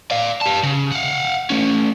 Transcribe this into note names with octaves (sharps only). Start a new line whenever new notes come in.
D5 F5
G4 A5
C#3
F5 F#5
A3 C#4